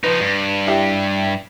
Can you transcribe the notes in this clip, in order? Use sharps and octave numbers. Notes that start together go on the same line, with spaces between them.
F3 D#4 B4
G2
E4 G4